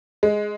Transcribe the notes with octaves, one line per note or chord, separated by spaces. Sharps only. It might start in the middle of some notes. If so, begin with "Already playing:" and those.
G#3